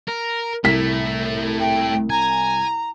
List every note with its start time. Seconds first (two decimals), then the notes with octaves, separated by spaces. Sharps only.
0.08 A#4
0.64 C2 A3 E4 B6
1.59 G5
2.10 G#5 A#5